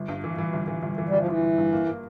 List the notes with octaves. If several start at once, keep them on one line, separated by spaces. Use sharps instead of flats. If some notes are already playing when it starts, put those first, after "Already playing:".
Already playing: G1
G2
E3
E3
G1
E3
G1
E3
G3
G1 F3
G1 E3
G1
G2
A#3
A#3